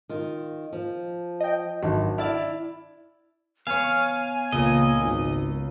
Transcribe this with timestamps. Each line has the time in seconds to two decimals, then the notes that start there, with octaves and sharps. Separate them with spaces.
0.09 D#3 F4
0.73 F3
1.41 D#5 G5
1.83 G#1 F#3 D4
2.18 E4 D5 A5 F6
3.67 B3 C#5 F5 G#5
4.52 C#2 A#2 D#5
4.99 G#1